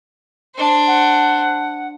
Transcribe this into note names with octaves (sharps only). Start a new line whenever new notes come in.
D4 C5
F#5